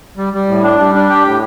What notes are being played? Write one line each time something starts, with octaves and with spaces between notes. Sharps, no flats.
G3
G3
A2
D4
G3
D4
G4
A2